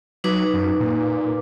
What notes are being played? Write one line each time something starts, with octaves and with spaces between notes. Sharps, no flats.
F#3 D#4 B4 D6
F#2
A#2